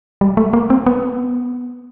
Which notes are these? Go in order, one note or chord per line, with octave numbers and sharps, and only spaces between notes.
G3
A3
A#3
C4
B3